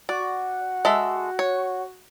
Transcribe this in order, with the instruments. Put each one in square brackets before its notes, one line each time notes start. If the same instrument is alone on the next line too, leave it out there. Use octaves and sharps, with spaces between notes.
[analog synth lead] F#4 [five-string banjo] D5
[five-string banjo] G#3 A4 E5
C#5